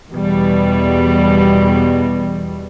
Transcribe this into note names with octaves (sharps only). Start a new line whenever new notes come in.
E2 B2 G3